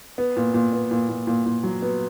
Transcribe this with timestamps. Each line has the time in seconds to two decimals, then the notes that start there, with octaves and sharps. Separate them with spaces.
0.18 B3
0.36 A#2
0.54 A#2
0.73 B3
0.91 A#2
1.09 A#2
1.27 A#2
1.46 A#2
1.63 F#3
1.82 B3